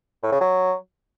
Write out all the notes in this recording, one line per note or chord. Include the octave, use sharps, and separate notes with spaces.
A2
C#3
F#3